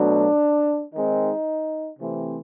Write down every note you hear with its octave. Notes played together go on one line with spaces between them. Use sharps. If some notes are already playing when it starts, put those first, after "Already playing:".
Already playing: B2 F#3 A3 D4
D#3 G#3 C4 D#4
C3 E3 A3 C4